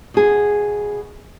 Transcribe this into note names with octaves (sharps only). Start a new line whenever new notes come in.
B2 G#4